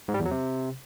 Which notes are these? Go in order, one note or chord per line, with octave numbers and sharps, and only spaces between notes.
G#2
G3
E2
F#3
C3